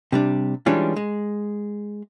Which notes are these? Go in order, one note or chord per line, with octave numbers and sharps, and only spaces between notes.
C3 G3 D4
E3 G3 G#3 C#4 D4 F4
G#3